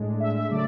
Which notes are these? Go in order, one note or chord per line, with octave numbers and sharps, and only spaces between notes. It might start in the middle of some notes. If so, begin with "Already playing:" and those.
Already playing: A2 G#3 D4
E5
E5
C#3 F#3 A3 D5